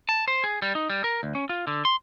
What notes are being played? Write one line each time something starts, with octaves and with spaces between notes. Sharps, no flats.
A5
C5
G#4
G3
D#4
G3
A#4
D2
C#4
F4
D3
C6